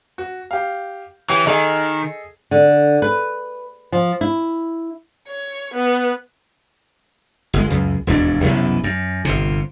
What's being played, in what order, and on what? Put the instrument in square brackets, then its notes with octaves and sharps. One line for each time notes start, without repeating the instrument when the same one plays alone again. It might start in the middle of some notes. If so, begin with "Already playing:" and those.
[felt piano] F#4
G4 F5
[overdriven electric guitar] E3 [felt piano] G4 C#5
[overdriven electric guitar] D#3 [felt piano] G#4 A4 D#5
[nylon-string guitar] D3
B4
F3
E4
[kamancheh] C#5
B3
[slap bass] G1 G#3
C#2 F#2
E1 D#2 G#2 D4
C2 F#2 B2 E3
F#2
G1 C3